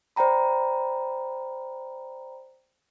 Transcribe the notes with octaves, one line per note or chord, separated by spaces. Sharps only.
C5 D5 G5 A#5 B5